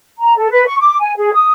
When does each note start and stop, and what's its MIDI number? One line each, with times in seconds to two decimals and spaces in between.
0.20 0.33 82
0.36 0.47 69
0.50 0.64 71
0.65 0.76 85
0.79 0.95 86
0.99 1.12 80
1.16 1.32 68
1.33 1.52 87